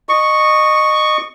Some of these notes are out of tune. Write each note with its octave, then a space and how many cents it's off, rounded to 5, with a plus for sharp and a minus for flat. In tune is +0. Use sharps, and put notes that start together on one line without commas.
D#5 -25 C#6 +0